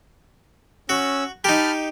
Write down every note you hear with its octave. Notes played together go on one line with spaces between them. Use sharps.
C#4 F#4 E6
D#4 G4 A5 B5 F6